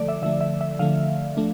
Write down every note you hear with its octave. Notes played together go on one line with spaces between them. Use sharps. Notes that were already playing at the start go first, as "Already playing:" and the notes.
Already playing: D3 F3 A3 A4 D5
E5
D3 F3 A3 E5
E5
E5
D3 F3 A3 F5
F3 A3 D4